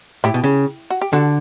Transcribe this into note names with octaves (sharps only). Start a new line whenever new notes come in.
A2 E4 G4
B2
C#3
F#4
G4
D3 F#4 A4